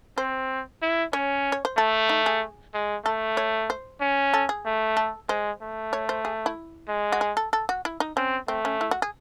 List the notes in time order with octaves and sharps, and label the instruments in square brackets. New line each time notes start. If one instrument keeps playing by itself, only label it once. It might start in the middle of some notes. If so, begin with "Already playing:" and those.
[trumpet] C4 [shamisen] C5
[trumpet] E4
[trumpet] C#4 [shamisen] C#5
[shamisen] C#5
C5
[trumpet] A3 [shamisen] A4
[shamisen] D#4
G#4
[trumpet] G#3
[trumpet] A3 [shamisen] A4
[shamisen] C#5
C5
[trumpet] C#4
[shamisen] A4
G#4
[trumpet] A3
[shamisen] A4
[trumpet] G#3 [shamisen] C5
[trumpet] A3
[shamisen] C#5
C5
G#4
E4
[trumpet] G#3
[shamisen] F#4
G#4
A4
A4
F#4
E4
D#4
[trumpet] C4 [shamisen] C#4
[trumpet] A3 [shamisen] C4
[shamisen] C#4
E4
F#4
G#4